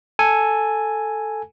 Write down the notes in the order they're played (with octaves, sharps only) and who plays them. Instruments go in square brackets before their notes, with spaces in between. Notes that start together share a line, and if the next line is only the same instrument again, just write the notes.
[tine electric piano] A4 G#5